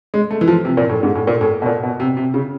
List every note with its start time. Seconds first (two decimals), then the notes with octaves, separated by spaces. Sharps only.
0.14 G#3
0.31 A3
0.41 E3
0.48 F3
0.65 C3
0.77 A#2
0.89 A2
1.03 G#2
1.15 A2
1.27 A#2
1.41 A2
1.62 B2
1.66 A#2
1.83 B2
2.00 C3
2.17 C3
2.34 C#3